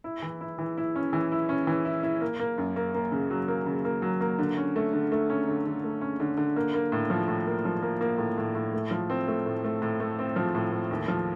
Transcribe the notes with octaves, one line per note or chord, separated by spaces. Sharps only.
E4
E3
E4
E3
E4
C#4
E3
E4
C#4
E3
E4
E4
A#3
A#3
F#2
A#3
A#3
C#3
F#3
A#3
C#3
A#3
F#3
A#3
D3
C#4
A3
D3
A3
C#4
D3
D3
A3
C#4
D3
D3
A#3
A#3
A2
F3
A2
A#3
F3
A#3
A#3
A2
A2
A2
A3
F3
C4
A3
A2
A3
A2
A3
C4
F3
A2
A3
D#2
F3